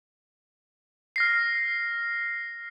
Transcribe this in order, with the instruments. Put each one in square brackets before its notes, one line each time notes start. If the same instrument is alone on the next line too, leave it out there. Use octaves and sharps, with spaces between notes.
[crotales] F6 A#6 C7